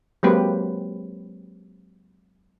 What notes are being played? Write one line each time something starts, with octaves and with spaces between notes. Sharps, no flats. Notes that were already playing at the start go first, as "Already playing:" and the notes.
F#3 G#3 A#3 C4 G4 B4